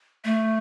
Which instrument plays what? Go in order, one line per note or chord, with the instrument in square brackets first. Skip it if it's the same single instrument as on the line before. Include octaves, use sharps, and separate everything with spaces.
[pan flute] A3